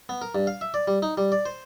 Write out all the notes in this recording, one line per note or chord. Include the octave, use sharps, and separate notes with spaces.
B3
A#4
G2
F5
E5
D5
G3
D#4
G3
D5
C5